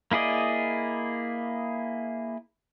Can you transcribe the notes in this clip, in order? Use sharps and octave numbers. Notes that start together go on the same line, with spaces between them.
A#3 E4 G#4 D5 D#5